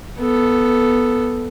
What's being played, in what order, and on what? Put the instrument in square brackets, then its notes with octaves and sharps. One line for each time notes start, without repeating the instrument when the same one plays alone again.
[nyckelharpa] B3 A4